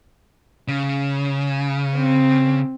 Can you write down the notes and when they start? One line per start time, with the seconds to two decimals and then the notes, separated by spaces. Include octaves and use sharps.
0.68 C#3
1.96 C4